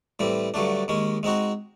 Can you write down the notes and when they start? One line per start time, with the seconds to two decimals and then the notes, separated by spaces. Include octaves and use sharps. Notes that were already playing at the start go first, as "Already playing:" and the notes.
0.19 A2 E3 G3 C4
0.54 G2 D3 F#3 A3 D4
0.88 D#2 D#3 G#3 C#4
1.23 G#3 C4 D#4 F#4